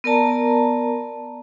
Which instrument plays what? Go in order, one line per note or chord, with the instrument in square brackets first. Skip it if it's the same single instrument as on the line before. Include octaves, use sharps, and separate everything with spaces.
[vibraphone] B3 A#4 D5 A5 A#5